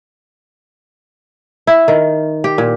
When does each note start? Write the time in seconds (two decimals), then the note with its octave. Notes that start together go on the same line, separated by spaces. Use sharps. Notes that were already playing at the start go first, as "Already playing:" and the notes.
1.67 E4
1.88 D#3
2.44 G4
2.58 A#2